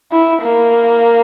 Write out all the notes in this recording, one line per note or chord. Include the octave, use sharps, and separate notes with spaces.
E4
A#3